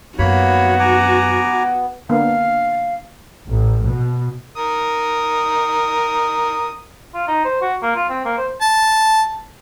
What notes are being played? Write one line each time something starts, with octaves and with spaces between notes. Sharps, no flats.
F#2 A#3 B3 F#4 C#5 B5
G#5 A#5 D6
D3 A#3 B3 F5
A1
B2
A#4 D#6
F4
D#4
C5
F#4
A#3
F4
C4
A#3
C5
A5